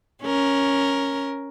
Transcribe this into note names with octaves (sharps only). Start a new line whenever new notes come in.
C#4 A#4